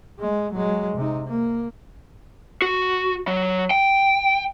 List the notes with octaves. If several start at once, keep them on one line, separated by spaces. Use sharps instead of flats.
G#3
F#3 G#3
C3 D#4
A#3
F#4
F#3
G5